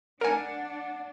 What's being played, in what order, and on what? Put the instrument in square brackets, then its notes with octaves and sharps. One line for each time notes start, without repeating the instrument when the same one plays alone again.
[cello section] D4 [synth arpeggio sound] A#4 G#5 [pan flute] F#5